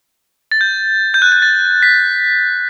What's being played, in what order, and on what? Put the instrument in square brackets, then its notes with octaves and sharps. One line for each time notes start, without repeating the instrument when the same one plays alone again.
[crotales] A6
G6
G6
F#6
G6
A6
B6